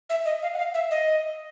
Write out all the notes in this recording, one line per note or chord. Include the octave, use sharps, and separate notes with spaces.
E5
D#5
F5
F#5
F5
E5
D#5